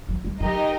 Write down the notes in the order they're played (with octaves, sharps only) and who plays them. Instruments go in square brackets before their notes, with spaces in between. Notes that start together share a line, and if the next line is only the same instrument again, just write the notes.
[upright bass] F#3
G3
[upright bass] F#3 [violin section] D#4 G4 A#4 D#5